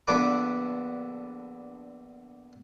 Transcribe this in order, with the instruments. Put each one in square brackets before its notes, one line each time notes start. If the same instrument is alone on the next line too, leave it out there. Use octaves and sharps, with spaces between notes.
[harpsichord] A#1 D3 B3 B4 D6